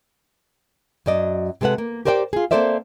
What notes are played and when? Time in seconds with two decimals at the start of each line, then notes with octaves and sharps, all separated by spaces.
1.06 F#2 F#3 D5 D#5
1.61 C3 G#3 A4 B4 F#5
1.78 A#3
2.05 G4 A#4 C5 D5 F#5 G5
2.33 F4 G#4
2.51 A#3 C4 A4 C5 D5 E5